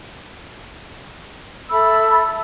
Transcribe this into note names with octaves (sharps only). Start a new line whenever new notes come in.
A4 E5 B5 E6